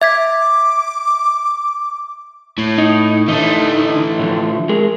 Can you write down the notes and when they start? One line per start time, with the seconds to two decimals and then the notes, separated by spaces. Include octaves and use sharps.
0.02 E5 D6 G#6 B6
2.58 A2
2.78 D#4
3.28 D3 E3 A3 D#4
4.19 A2 D3 F3
4.69 G#3 G#4 A#4